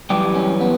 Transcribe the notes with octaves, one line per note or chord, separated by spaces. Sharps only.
F#2 E3 G3 G4
C#4
B3